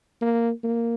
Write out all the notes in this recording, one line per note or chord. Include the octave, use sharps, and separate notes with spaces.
A#3
A#3